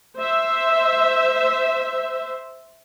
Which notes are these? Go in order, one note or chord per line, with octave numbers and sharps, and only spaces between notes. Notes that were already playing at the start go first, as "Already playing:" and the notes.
C5 E5